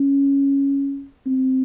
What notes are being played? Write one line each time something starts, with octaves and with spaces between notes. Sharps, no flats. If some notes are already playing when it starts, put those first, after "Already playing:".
Already playing: C#4
C4